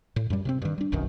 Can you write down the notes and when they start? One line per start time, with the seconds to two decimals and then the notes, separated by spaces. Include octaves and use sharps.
0.16 A2
0.30 F#2 G3
0.45 C3 A#3 C4
0.62 G2 D#3
0.78 G3 D4
0.92 F1 B1 F#2 D#3